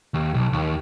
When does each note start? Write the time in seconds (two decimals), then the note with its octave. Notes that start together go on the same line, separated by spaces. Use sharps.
0.14 D#2
0.34 B1
0.53 D#2